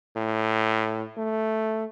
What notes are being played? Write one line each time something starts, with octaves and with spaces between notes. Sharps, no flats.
A2
A3